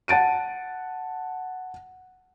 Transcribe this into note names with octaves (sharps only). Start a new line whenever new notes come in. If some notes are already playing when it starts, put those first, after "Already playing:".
F#5 A5 A6 D7 D#7